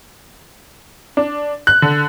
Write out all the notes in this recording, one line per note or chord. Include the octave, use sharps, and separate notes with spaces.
D4
F#6
D3